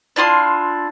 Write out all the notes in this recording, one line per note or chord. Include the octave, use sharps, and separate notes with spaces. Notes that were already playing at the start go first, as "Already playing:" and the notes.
D4 E4 F4 C6